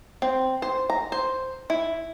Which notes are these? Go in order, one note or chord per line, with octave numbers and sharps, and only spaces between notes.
C4
C5
A#5
C5
E4